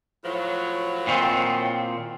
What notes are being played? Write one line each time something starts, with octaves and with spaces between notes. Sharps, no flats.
A2 F3 F#3
A#2 D#3 C4